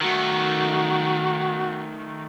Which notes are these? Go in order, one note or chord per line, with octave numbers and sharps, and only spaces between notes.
D#3 A3 F#4